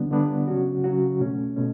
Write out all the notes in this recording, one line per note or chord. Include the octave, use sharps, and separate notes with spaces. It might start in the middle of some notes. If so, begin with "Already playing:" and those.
Already playing: D3 G3 B3 D4
D3 G3 B3 D4
C#3 F#3 C#4 F#4
C#3 F#3 C#4 F#4
B2 A3 C#4
B2 A3 C#4